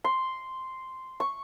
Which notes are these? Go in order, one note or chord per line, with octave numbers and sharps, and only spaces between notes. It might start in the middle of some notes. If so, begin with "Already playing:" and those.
C6
C#6